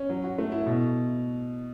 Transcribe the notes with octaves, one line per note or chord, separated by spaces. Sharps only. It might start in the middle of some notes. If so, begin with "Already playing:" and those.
Already playing: C#4
F#3
F#4
A3
E4
B2